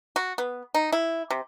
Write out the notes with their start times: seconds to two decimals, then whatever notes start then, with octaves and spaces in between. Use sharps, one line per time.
0.16 F#4
0.38 B3
0.74 D#4
0.92 E4
1.30 C3